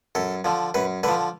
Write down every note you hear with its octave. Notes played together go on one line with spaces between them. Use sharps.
F#2 A4
D3 F3
F#2 B4
D3 F3 B4